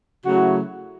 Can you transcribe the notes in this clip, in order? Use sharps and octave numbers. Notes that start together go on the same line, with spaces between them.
C#3 F#3 A3 E4 F#4